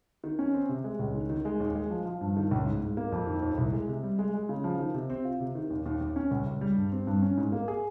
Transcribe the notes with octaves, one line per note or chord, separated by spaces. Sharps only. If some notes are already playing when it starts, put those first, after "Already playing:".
D#3
C#4
C4
C3
G#3
C#2
D#3
D#3
G#3
D#2
G#3
F3
F3
G2
D#3
C#2
G#2
G#2
A#3
F2
D#3
D#2
C2
G#3
C3
G3
G#3
G#3
C#3
F3
D#3
C3
C4
F4
C3
D#3
D#2
D#2
D#2
C#4
C#2
C#2
G3
G2
C4
G2
C#4
G#2
A#3
G#4